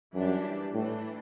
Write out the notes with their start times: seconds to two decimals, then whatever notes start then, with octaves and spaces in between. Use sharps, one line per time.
0.14 F#2 E3 G3 D4 G4
0.74 A2 E3 A3 D4